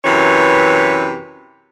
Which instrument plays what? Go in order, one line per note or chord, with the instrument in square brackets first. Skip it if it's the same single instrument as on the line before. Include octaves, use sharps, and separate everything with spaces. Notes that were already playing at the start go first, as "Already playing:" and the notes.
[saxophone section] F#2 C3 E3 B4 C#5